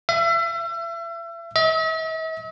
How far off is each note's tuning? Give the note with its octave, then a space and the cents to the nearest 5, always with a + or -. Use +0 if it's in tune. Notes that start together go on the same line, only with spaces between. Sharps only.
E5 +35
E5 -45